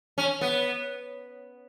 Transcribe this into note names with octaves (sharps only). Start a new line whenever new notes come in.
C#4
B3